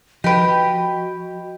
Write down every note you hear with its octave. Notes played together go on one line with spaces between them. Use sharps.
F3 F#4 G4 B4 D#5 G5